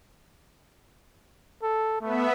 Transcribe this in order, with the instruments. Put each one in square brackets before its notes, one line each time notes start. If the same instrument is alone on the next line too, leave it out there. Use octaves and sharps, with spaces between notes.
[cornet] A4
[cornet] A3 [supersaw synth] B3 E5